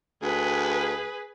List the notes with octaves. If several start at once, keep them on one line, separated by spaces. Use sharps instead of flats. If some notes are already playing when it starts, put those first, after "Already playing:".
D2 G#4 B4